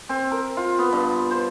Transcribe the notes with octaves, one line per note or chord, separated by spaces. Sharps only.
C4
A#4
F4
B3
G2
C5